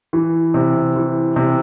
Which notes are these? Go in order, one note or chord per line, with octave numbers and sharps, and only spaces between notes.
E3
C3
E3
C3